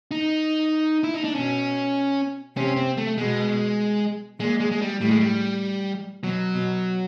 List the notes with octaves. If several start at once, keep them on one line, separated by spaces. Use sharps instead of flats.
D#4
E4
D#4
D4
B2 C#4
C3 C#4
C4
A3
B2 G#3
A#2 G#3
G#3
G#3
G3
A2 G3
G#3
G3
B2 F#3
B2